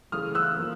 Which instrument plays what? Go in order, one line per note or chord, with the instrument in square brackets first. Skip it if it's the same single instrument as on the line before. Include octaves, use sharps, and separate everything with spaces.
[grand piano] C#3 E3 A3 D#6 F6
E6 F#6
F3 A#3